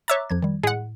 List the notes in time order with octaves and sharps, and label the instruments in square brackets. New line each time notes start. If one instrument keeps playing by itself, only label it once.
[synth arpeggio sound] C#5 E5 A6 [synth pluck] A#5 D6 F#6
[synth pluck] F2 F3 G#6
D#3 G3
[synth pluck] A2 [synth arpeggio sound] G#3 F#5